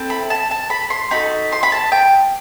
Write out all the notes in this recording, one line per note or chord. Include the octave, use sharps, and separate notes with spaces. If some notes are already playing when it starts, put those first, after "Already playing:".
Already playing: C4 E4 A4
B5
A5
A5
B5
C6
D#4 F#4 A4 B5
C6
B5
A5
G5